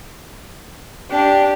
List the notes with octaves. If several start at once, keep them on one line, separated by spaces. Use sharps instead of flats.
D4 G4